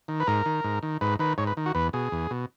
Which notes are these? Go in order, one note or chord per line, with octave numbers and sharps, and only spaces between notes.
D#3
B4
G#2 A#4
D#3
G#2
D#3
G#2 B4
D#3 B4
G#2 C#5
B4
D#3
F#4
E2 B4
B2 G#4
E2
B2